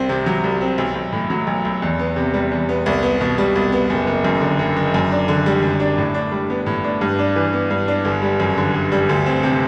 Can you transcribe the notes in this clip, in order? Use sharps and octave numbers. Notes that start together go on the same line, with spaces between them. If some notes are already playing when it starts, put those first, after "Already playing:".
Already playing: C2 C4
C3
F#3
C2
C4
B1
B1
A2
F#3
B1
B1
E2
B3
C3
G3
E2
B3
C2
B3
B2
G3
C2
B3
F#1
F#1
F#2
D3
F#1
F#1
F#2
D4
D3
G3
F#2
D4
A2
D4
G3
B3
A2
D4
G2
D4
E3
B3
G2
D4
G1
G3
F#2
D3
G1
G3
D2
C4
C3